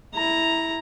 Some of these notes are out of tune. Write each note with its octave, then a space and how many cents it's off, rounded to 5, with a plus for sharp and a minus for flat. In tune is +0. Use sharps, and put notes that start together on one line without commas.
E4 -10 A#5 +0